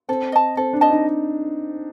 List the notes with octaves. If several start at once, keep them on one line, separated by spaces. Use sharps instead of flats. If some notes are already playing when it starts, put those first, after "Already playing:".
C4 A4
D#5 A5
C4 A4
D4
D#5 A5
D#4